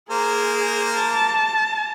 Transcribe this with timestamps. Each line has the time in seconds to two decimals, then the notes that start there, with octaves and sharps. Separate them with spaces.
0.10 A#3 G#4 A#4 C5
0.95 A5